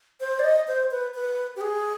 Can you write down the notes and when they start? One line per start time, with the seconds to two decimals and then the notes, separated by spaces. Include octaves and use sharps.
0.21 C5
0.39 D5
0.44 D#5
0.68 C5
0.91 B4
1.14 B4
1.56 G4
1.61 G#4